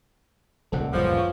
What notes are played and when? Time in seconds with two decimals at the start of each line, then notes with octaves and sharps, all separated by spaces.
0.72 D#1 C#2 C3 A4 F#5
0.93 G1 F#2 E3 F3 G3
1.17 C#5